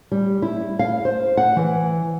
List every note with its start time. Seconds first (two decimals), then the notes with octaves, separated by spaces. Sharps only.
0.12 G3
0.42 E4
0.79 F5
1.05 C5
1.37 F#5
1.56 E3